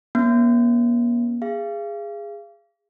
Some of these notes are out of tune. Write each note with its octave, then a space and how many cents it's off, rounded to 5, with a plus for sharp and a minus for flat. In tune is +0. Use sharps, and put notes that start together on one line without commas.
A#3 +45 C#4 +0
G#4 -15 F5 -35